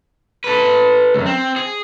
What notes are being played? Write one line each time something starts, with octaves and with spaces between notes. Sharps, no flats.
A4 B4
C#2 F#2
C4
G#4